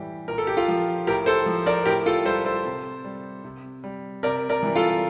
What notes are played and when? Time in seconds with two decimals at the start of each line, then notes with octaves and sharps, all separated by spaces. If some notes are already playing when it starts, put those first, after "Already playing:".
Already playing: A2 E3 G3 G4
0.28 A#2 A#4
0.38 A4
0.47 G4
0.57 F4 A4
0.68 F3
1.07 A2 G4 A#4
1.26 A4 C5
1.46 F3
1.66 A#4 D5
1.85 A2 G4 A#4
2.06 F4 A4
2.25 G3 A4 C5
2.45 A4 C5
2.65 C3
3.04 G3
3.44 C3
3.84 G3
4.23 C3 A#4 D5
4.49 A#4 D5
4.63 E3 G3
4.76 F4 A4